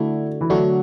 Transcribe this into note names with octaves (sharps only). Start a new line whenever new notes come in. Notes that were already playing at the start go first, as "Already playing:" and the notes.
Already playing: D3 A3 D4 E4 F#4
E3
D3 F#3 A3 D4 F#4